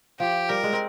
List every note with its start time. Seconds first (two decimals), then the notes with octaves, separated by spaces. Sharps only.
0.20 F3 G4
0.49 G3 A#4
0.63 G#3
0.73 C4